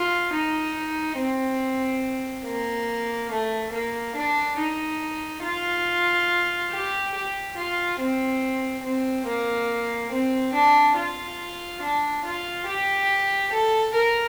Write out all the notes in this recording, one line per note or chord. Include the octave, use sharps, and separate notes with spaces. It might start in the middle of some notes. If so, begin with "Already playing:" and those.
Already playing: F4
D#4
C4
A#3
A3
A#3
D4
D#4
F4
G4
G4
F4
C4
C4
A#3
C4
D4
F4
D4
F4
G4
A4
A#4